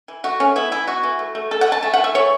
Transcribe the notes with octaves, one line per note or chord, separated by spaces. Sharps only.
E3
A3 F#4
A3 C#4
B3 E4
E3 E4
B3 F#4
E3
A3
A3
A3 A4
F#5
A3
A5
A3 A5
F#5
E3
E5
E3 C#5